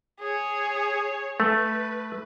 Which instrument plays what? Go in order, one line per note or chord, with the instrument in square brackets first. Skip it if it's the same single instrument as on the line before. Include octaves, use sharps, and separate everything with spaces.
[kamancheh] G#4 C#5
[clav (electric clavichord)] A3 [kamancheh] B4